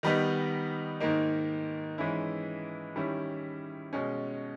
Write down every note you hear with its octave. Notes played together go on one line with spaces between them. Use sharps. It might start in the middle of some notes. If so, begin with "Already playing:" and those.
D#3 G3 B3 D#4
G#2 D#3 A#3 D#4
G#2 E3 G#3 C#4 E4
D#3 G3 C#4 E4
B2 G#3 C#4